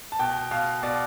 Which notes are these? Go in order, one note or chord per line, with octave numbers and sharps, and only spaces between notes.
A5
B2 G5
B2 F5
B2 D5